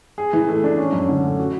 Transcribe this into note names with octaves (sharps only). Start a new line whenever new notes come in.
G#4
E3
A3
D4
C#4
F#2
D3
A3
F#4